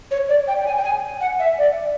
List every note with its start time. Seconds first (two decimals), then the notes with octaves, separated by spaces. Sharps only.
0.11 C#5
0.29 D5
0.48 G5
0.61 G5
0.66 G#5
0.78 G5
0.84 G#5
1.21 F#5
1.39 E5
1.58 D5